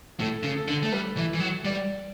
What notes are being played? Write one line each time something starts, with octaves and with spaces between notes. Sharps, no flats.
A2 A4
C#3
A4
D3
A3
G3 B4
E3
E3
F#3
G3 D5